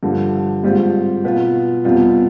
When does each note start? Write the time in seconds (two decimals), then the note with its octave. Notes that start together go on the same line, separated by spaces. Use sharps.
0.03 G2 D3 F3
0.63 G#2 G3 C4 F4
1.24 B2 B3 F4
1.85 F2 C3 G3 B3 F4